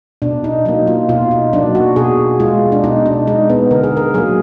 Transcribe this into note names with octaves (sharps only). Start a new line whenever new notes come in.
B2 D4
D#4
F#3 A#3 D#4
F4
B2 F4
D#4
F#3 A#3 D4
F#4
B2 G#4
G#3 F4
D4
B2 D#4
D4
G#3 D#4
B3
D3 A#4
G#4
A#4
F#3 A#3 G#4